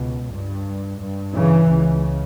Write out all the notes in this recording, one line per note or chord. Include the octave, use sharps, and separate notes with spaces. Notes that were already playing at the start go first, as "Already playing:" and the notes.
Already playing: C#2 B2
G2
G2
C#3 E3
C#2 C#3